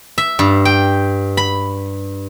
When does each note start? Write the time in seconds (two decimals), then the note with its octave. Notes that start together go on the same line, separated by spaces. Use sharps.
0.18 E5
0.39 G2
0.65 G5
1.37 B5